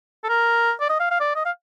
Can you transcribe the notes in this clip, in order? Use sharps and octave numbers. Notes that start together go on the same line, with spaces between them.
A4
A#4
D5
D#5
F5
F5
D5
D#5
F5